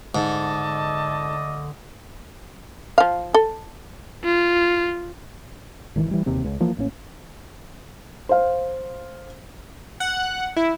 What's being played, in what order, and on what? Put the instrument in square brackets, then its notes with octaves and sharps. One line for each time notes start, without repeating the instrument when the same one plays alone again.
[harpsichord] G#2 [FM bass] D3 [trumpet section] A3 D5 D#5 [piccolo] A5
[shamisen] F3 F5
A4
[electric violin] F4
[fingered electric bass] G#1 D#3 E3
E3 G3
E1 D#2 C3 C4
C#2
E3 F3 A#3
A1 A2 A#3 C#4
[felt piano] C5 F5
[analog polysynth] F#5
E4